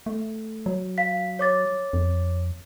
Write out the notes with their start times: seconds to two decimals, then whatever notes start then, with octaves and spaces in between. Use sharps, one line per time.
0.06 A3
0.66 F#3
0.98 F5 B6
1.39 C#5 D6 A6
1.93 F2